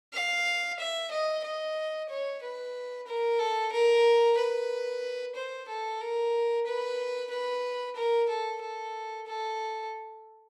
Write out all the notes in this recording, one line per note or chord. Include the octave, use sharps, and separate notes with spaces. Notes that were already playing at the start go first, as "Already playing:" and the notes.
F5
E5
D#5
D#5
C#5
B4
A#4
A4
A#4
B4
C5
A4
A#4
B4
B4
A#4
A4
A4
A4